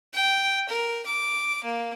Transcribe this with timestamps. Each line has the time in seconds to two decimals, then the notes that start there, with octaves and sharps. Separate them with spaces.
0.14 G5
0.69 A#4
1.06 D6
1.64 A#3